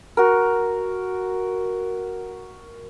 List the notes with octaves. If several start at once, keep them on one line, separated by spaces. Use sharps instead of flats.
F#4 A#4